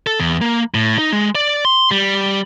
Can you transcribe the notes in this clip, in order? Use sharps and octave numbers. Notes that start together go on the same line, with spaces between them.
A4
E2
A#3
A2
D#4
G#3
D5
C6
G3